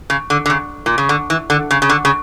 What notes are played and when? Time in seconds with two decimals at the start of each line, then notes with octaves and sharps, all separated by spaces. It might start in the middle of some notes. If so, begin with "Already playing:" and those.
0.10 C#3
0.30 D3
0.46 D3
0.50 C#3
0.86 A#2
0.98 C#3
1.09 D3
1.30 E3
1.50 D3
1.71 C#3
1.82 C#3
1.90 D3
2.05 C#3